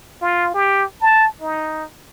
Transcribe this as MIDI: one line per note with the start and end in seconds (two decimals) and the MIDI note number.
0.22 0.50 65
0.54 0.84 67
1.01 1.27 81
1.41 1.84 63